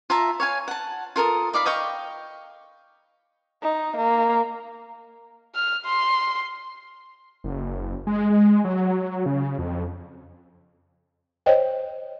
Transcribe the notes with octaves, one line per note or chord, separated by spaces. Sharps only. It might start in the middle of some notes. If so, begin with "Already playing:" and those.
F4 E5 A5 A#5
C#5 F5 G#5
F#5 A5
F4 A4 A#4 D#6
D#4 D5 F5 B5
D#5 F5 G5 C#6
D#4
A#3
F6
C6
F#1
G#3
G#3
F#3
C#3
F2
C5 C#5 D#5 G5